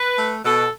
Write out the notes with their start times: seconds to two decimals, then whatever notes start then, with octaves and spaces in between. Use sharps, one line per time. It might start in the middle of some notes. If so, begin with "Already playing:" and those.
Already playing: B4
0.18 A3
0.44 B2 A4